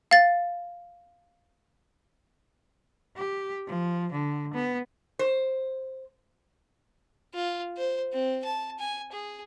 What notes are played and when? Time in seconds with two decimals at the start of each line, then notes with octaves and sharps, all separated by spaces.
0.11 F5 A6
3.16 G4
3.67 F3
4.12 D3
4.54 B3
5.19 C5
7.34 F4
7.77 C5
8.13 C4
8.44 A5
8.79 G#5
9.13 G#4